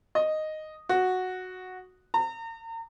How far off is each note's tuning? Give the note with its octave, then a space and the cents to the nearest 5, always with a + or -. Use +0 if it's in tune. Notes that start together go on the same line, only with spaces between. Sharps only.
D#5 -5
F#4 -5
A#5 -40